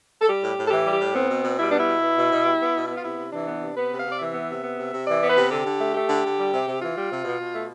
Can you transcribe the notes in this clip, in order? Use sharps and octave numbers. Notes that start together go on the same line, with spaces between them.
A4
G3 G4
A2
A2
A4
E3 G4
G3
G4
A2
B3 C4
B2
B2
G3 E4
B3 D4
E4
B2
B3
B2
B2
G3
B3
B2
B3 E4
F4
C3 E4
C3
E3 D4
B3
C3
B3 B4
C3
F5
C3
D5
E3 E5
B3
C3
B3
C3
C3
E3 D5
B3
B4
C3
D3 G4
D3
A3
A3 G4
D3
D3
G3
C3
C3
E3 F4
G3
C3
B2
B2
A3